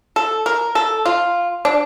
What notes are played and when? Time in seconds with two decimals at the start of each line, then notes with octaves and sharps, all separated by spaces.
0.16 A4
0.46 A#4
0.75 A4
1.05 F4
1.65 D4